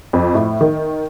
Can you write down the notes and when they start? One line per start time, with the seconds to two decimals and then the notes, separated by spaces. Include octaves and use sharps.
0.13 F2
0.35 A2
0.61 D#3